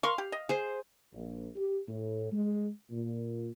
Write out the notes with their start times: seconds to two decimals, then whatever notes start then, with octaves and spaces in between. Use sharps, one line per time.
0.03 A#4 F5 C6 C#6
0.18 G4
0.32 D#5
0.49 G#4 C5
1.13 A#1
1.55 G4
1.87 A2
2.31 G#3
2.90 A#2